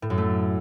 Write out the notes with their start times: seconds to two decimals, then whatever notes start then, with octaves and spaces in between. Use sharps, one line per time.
0.02 A2
0.10 F#2
0.18 A3